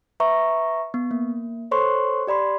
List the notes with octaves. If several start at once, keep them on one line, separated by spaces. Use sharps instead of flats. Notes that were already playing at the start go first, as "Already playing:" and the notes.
B4 E5 A#5 C#6
B3
A#3
A4 C5 C#5 C6 C#6
G4 D5 B5 C6